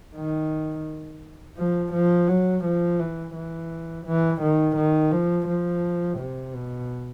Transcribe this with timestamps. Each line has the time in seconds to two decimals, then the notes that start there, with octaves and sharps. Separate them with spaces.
0.15 D#3
1.57 F3
1.93 F3
2.28 F#3
2.64 F3
2.99 E3
3.34 E3
4.05 E3
4.41 D#3
4.76 D#3
5.12 F3
5.47 F3
6.18 C3
6.53 B2